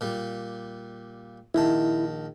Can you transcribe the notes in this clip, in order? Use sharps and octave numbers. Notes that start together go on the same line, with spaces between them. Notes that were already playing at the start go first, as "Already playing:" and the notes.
A#2 G3
A#1 D#3 E4 A5